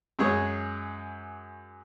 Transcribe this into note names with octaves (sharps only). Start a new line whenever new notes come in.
F#2 G#3 G#4 C#5